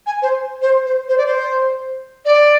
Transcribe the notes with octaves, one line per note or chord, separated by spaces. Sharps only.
G#5
C5
C5
C5
C5
D5
C5
D5